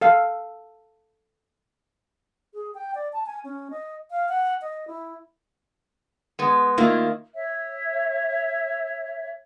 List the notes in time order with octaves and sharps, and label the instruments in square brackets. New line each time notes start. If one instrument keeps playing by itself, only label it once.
[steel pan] A4 F5
[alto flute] G#4
G5
D5
A5
G#5
C#4
D#5
F5
F#5
D#5
E4
[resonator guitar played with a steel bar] G#3 B3
[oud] D#3 A#3 [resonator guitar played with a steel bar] E4 F4
[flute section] C#5 E5